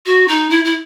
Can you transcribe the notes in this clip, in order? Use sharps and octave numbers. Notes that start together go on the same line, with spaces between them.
F#4
D#4
E4
E4